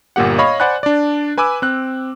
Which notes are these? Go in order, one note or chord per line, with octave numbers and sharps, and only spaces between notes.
G1 A#2 A#3 G4 F#5
C#5 D#5 F5 B5 C#6
C5 D5 F#5 G#5 B5 F#6
D4 D5
B4 G#5 B5 D6 E6
C4 F#6